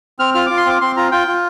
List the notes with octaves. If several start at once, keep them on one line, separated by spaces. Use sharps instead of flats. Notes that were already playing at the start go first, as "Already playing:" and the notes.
C4 F6
F4 F6
F4 D6
C6
C4 D6
C4 C6
F4 A#5
F4 G5
F4